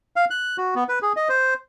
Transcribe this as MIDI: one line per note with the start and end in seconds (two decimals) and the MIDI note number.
0.16 0.25 77
0.30 0.57 90
0.58 0.75 66
0.75 0.84 59
0.89 0.99 71
1.02 1.13 68
1.17 1.28 75
1.29 1.54 72